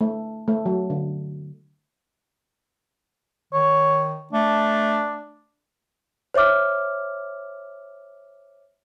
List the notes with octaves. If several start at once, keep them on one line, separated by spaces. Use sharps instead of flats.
A3
A3
F#3
D3
D#3 C#5
A3 D4
C5 C#5 E5 D6 F6